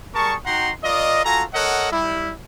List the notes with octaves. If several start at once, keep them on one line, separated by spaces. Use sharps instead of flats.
G3 G#4 A#4 A5 C#6
D#4 F#4 F#5 G5 A#5 C6
F4 A#4 D5 D#5
F4 F#4 A4 G#5 A#5
A4 A#4 C#5 D#5 F#5
G3 E4